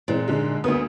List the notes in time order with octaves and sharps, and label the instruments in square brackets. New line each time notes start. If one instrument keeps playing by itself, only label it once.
[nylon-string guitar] A#2 [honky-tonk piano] E3 G#3 C4
[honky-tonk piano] G#2 D3 G#3
[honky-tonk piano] D2 A#3 D#6 [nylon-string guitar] B3